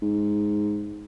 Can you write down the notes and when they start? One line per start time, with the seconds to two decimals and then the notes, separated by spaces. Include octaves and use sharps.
0.02 G#2